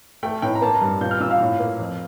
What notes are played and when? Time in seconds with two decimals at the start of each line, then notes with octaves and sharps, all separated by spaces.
0.23 A3 G5
0.42 A2 G5
0.55 A#5
0.62 A#3 A5
0.75 A#5
0.81 G2
1.01 A#2 G6
1.11 F6
1.20 A#2 E6
1.31 F5
1.41 A2
1.60 A#3
1.80 F2